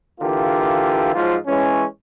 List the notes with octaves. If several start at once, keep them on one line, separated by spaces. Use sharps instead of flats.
D3 E3 A#3 F4 G4
G#2 F3 F#3 F4
E3 G#3 C#4